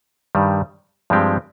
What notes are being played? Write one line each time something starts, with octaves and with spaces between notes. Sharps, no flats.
G2 D#3 G3
G2 F3 G#3 C4 G4